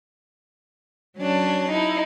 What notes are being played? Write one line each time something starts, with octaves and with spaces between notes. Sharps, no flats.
F#3 C#4 D4 A5
D#4 E4